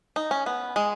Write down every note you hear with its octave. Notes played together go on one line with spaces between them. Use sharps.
D#4
C#4
B3
G#3